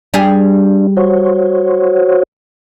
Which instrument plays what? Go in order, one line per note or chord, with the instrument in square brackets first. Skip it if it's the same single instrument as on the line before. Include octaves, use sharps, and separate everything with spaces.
[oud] G3 G#4 [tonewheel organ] D4
[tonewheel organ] F#4 C5 C#5